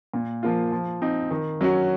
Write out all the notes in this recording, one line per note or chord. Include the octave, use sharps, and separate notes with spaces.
A#2
F3 A#3 F4
F3
C4 D#4
D#3
F#3 C#4 F#4